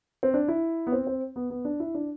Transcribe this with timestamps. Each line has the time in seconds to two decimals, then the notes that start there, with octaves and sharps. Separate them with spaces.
0.23 C4
0.34 D4
0.48 E4
0.87 B3
0.92 C4
1.07 C4
1.36 B3
1.50 B3
1.65 D4
1.80 E4
1.94 D4